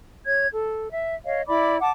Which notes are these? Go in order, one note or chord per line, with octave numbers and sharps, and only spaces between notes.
C#5 G#6
A4
E5
C#5 D#5 F5
E4 D5 B5 D6
F#5 A5 D6